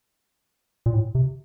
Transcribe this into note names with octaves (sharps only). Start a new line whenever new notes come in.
A#2
A2
C3